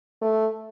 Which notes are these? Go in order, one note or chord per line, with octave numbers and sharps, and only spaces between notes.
A3